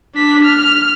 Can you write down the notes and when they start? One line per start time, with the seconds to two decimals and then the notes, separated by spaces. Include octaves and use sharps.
0.15 D4 B6
0.45 F6